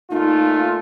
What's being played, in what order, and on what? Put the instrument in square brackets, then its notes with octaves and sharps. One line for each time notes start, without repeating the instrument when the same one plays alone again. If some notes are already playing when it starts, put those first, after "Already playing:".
[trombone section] A#2 A3 F4 [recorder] D#4